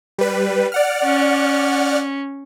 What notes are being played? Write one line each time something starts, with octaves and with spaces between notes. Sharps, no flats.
G3 B4
D5 F#5 F6
C#4